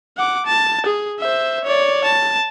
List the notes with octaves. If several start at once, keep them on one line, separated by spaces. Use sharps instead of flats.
F#5 D6
A5
G#4
C5 E5
C#5 D5
A5